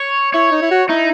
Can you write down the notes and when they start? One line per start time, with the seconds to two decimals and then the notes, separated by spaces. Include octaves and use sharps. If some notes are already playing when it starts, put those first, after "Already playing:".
Already playing: C#5
0.34 E4 C#5
0.52 D#4
0.62 E4
0.71 F#4
0.89 D#4 E4